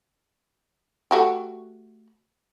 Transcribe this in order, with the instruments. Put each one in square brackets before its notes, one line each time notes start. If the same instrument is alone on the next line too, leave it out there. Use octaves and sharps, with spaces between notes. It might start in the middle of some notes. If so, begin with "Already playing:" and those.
[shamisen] A3 F#4 G4